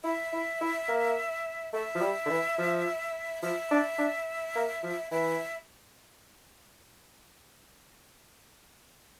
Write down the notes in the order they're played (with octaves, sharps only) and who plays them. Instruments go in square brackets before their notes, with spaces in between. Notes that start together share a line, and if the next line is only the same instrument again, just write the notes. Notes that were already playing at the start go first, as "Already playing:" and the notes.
[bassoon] E4 [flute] E5
[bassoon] E4
E4
A#3
[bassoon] A3 [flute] E5
[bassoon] F3
G3
D3
E3
F3
[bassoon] F3 [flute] E5
[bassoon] D4
D4
A#3
F3
[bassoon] E3 [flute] E5